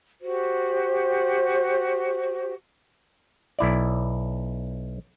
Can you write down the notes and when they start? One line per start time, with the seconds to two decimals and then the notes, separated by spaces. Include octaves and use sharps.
0.21 F#4 G4 C5
3.59 B1 E4 D5